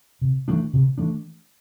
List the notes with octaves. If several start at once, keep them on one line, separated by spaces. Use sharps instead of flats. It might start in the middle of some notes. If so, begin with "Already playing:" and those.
C3
E3 A3 D4
C3
E3 A3 D4